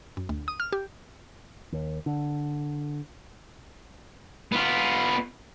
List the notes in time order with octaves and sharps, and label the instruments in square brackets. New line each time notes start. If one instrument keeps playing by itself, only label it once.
[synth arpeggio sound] F#2
D2
D#6
F6
G4
[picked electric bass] D#2
D3
[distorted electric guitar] B3 F4